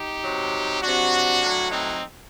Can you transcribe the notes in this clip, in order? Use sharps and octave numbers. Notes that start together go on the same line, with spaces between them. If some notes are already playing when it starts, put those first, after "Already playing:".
Already playing: D#4 G4
C3 F#3
C3 F#3 D4 F#4
A2 F#3
C4 D#4